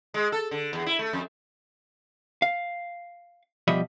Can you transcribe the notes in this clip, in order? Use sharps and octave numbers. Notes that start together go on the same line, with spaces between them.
G#3
A4
D3
E2
E4
A3
F2
F5
B2 F3 G3 D#5 E5 B5